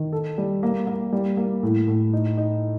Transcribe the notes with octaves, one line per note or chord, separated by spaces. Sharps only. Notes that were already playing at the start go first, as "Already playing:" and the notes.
Already playing: D#3
A4
G3
A#3
A#3
G3
A#3
A2
A2
D#4
D#4